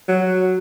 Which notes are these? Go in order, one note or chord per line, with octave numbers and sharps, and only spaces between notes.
F#3